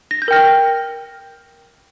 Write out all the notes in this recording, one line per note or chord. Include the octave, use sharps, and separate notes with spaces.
A#6
G6
A#4 G5 F6 A#6